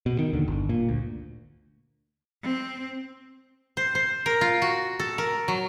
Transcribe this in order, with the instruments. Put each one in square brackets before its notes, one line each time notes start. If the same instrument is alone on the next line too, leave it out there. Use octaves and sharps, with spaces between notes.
[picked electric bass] B2
D#3
D#2 D3
G1
A#2
D2
[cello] C4
[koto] C5
C5
A#4
F4
F#4
A4
A#4
F#3